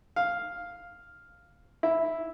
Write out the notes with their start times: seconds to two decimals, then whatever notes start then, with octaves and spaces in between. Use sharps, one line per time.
0.16 F5
1.83 E4